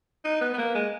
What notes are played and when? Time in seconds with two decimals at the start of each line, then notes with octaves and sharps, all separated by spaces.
0.24 D#4
0.41 B3
0.54 B3
0.58 A#3
0.75 G#3